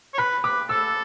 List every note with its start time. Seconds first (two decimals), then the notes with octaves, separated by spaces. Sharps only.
0.14 C#5
0.18 B4 B5
0.44 B4 D6
0.69 A4 E6